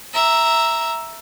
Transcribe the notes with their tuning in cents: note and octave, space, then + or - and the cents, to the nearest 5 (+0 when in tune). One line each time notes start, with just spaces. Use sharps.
E5 +0 A#5 +0